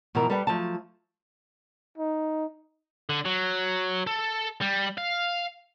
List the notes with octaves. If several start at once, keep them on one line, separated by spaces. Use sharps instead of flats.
B2 E3 F3 A#4
G3 A4 B4 G5
F3 F#3 A3 A5
D#4
D3
F#3
A4
G3
F5